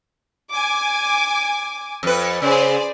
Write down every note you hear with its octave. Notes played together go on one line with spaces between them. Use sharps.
G#5 D6
F2 B4
C#3 G#4 C5 D5